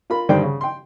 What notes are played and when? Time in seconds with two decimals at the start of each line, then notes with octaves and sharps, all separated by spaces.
0.10 F4 A#4 B5
0.29 G2 D3 D#3 C5 D5 G5
0.43 C#3
0.61 G5 C6